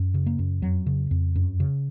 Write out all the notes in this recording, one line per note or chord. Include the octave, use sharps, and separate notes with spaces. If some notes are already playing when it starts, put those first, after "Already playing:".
Already playing: F#2
C#3
A#3
F#2
F2 F#3
C#3
F2
F#2
C#3